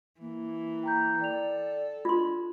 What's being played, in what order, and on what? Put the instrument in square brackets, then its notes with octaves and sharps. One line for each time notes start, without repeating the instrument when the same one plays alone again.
[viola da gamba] E3 [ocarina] A#3
[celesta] G5 A#5 G6
[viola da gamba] A4 [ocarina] D5 [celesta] G5 F7
[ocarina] D4 [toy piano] F4 C6 [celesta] G#6